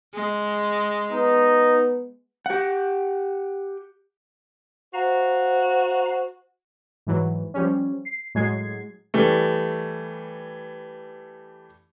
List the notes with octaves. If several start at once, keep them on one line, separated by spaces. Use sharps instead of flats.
G#3
B3 D#4
G4 F#5
F#4 C5 F5 A#5
G#2 E3 F#3
F3 G3 C#4
C7
A2 F#3 G#3 G#6 C7
E3 G3 A3